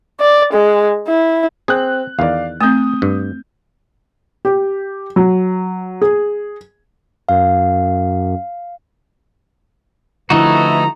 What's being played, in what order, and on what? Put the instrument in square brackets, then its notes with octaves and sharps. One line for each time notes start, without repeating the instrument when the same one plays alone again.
[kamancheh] D5
G#3
E4
[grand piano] C4 F#6 [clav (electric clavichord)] G#4
[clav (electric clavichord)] E2 D#3 [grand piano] D5 F5
[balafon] A3 C4 [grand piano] D#6 G6
[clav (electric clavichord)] G2
[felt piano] G4
F#3
G#4
[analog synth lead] F#2 [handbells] F5
[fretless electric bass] D3 F3 [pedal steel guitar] A3 D#4 F#4 [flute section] E4 B4 [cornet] A#5